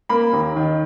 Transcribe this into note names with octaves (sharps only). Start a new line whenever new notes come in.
A#3 B5
D#2
D#3